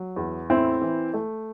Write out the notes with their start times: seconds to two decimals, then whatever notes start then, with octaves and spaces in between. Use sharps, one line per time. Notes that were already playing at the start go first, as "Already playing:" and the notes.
Already playing: F#3
0.16 E2
0.49 A2 C4 E4
0.82 E3
1.14 A3